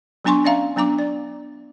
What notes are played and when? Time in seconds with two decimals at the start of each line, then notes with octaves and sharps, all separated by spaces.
0.25 F#3 B3 D4 G#5 C6 C#6
0.44 C#4 D5 E5 F5 A#5
0.76 F#3 B3 D4 A#5 D6
0.99 D5